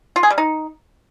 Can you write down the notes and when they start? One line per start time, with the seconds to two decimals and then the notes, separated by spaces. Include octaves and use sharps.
0.16 F4
0.23 G#4
0.30 G3
0.38 D#4